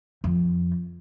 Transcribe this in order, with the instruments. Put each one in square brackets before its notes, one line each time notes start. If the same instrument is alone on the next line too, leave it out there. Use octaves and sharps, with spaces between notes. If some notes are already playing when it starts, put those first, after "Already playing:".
[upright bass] F2